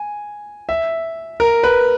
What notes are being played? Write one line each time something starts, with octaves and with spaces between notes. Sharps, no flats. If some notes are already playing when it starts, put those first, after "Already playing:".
Already playing: G#5
E5
A#4
B4